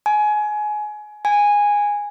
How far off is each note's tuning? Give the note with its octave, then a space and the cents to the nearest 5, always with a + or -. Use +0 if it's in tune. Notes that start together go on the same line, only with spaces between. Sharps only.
G#5 +20
G#5 -10